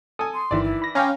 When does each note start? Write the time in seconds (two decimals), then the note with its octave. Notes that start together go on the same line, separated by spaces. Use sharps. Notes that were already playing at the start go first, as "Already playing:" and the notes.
0.19 A4 G#5 D#6
0.34 C6
0.51 G1 D#3 E3 D5
0.64 E4
0.82 B5 A#6
0.95 C#4 F5 G5 G#5 A#5 C#6 D6